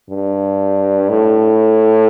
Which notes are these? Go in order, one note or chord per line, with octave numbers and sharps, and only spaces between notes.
G2
A2